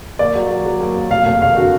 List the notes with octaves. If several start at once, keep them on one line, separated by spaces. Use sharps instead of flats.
D#2 D5
F#3
F#3
F#3
D#2
D#2
F1 F5
F1 F5
D#2 F5
D3 F#4